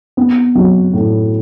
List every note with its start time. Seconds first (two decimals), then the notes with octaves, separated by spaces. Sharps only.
0.17 B3
0.55 F#3
0.93 A2